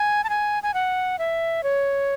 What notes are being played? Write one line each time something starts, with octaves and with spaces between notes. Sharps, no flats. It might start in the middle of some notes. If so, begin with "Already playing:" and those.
Already playing: G#5
A5
G#5
G#5
F#5
E5
C#5